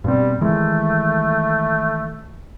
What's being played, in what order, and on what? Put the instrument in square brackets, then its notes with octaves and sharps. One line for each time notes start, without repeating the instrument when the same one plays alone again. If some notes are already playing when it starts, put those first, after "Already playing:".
[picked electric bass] G2 B2 C4 [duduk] G3
[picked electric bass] D#3 E3 G#3 [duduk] A3